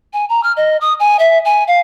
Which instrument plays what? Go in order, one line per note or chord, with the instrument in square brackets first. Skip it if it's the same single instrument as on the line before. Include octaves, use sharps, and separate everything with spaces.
[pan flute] G#5
A#5
F6
D#5
D#6
G#5
E5
G#5
F5